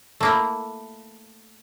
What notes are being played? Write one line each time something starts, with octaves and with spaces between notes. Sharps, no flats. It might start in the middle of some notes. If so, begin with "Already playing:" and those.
A3 A#3 E4